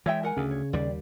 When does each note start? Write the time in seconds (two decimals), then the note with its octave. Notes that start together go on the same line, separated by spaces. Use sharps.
0.06 E3 G#3 C#5 E5 G5
0.23 A#4 F#5 G#5
0.37 D2 C#3
0.51 C#5
0.73 D#2 G3 D5